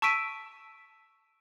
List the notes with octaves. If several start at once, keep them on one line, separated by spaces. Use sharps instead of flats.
A5 C#6 E6 B6 D7 D#7